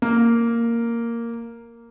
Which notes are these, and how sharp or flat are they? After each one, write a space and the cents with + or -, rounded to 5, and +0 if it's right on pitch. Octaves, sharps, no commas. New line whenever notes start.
A#3 -5